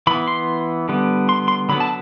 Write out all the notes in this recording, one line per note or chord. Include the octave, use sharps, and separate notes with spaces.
E3 B3 B5
C6
D3 G3 B3
C6
C6
D3 F#3 B3 B5
A5